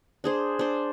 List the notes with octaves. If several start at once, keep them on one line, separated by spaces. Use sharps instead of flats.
D4 G#4 C5
D4 C5